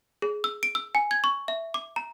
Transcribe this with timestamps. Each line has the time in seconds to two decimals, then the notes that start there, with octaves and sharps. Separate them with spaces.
0.22 G#4
0.44 E6
0.63 D7
0.75 E6
0.95 G#5
1.11 G#6
1.24 C#6
1.48 E5
1.74 D6
1.96 A#5